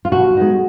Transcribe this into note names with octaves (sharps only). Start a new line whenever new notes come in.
F4
B2 F#4
G#3 B3 D#4